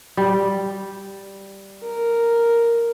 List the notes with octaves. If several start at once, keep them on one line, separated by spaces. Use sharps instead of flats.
G3
A#4